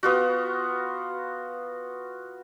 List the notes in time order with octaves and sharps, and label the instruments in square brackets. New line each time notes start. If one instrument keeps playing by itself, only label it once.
[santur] B3 F4 F#4